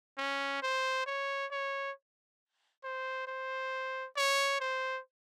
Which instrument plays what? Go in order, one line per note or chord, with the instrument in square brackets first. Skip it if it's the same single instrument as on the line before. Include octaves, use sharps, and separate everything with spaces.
[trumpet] C#4
C5
C#5
C#5
C5
C5
C#5
C5